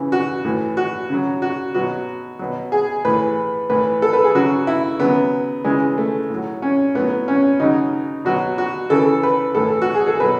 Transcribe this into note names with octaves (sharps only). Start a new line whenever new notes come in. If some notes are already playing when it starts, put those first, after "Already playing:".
Already playing: C#3 E3
F#4
A2 E3
F#4
C#3 F#3
F#4
B2 F#3 F#4
B2 F#3
G#4
A2 E3 B4
A2 E3 B4
A4
B4
G#4
C#3 F#3 F#4
E4
C#3 F#3 B3
C#3 E3 G#3
A3
A2 F#3
C#4
A2 F#3 B3
C#4
C#3 F#3 D#4
B2 F#3 F#4
F#4
C#3 E3 A4
B4
A2 E3 A4
F#4
G#4
A4
B2 F#3 B4